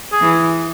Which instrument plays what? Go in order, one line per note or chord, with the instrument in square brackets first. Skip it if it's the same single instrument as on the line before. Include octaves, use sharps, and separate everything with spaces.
[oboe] G#4
[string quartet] E3